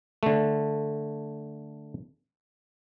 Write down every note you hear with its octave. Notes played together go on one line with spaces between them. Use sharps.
D3 A3